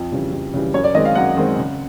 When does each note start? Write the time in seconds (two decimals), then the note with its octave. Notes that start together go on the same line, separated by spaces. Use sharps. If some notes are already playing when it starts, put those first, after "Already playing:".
Already playing: F2
0.12 C#3 E3 G3
0.33 F2
0.54 C#3 E3 G3
0.74 F#2 C#5
0.84 D5
0.94 D#3 G#3 C4 D#5
1.05 F5
1.15 F#2 F#5
1.36 D#3 G#3 C4
1.57 C#3